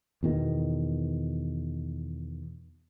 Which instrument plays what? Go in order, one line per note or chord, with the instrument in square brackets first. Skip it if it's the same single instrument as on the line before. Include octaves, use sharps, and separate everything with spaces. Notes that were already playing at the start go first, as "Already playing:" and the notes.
[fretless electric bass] E2 B2 D#3